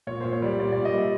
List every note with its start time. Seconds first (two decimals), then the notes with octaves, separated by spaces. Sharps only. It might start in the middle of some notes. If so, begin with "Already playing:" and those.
0.07 A#2 C#5
0.21 A#2 C5
0.33 C#5
0.42 G3 D5
0.59 A#2 D5
0.72 A#2 D5
0.85 D#5
0.94 G3 E5